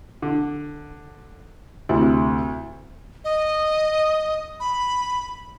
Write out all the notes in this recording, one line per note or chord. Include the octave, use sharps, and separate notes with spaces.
D3
D2 C3 E4
D#5
B5